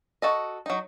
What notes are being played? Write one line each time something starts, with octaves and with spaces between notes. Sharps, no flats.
F#4 A4 D#5
F#3 D#4